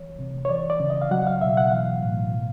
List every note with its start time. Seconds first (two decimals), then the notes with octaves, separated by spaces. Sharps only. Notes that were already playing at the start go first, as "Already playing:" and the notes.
Already playing: E3 C#5
0.19 C3
0.45 C#5
0.49 E3 D5
0.70 D5
0.80 C#3
0.90 D#5
1.02 F5
1.11 F#3 F#5
1.27 F5
1.41 B2 E5
1.57 F#5
1.71 E3 F5
2.02 A2
2.32 B2